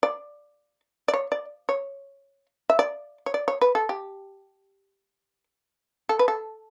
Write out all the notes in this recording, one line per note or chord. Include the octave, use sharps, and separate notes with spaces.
D5
D5
C#5
D5
C#5
E5
D5
C#5
D5
C#5
B4
A4
G4
A4
B4
A4